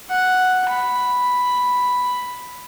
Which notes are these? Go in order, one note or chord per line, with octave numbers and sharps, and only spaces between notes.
F#5
B5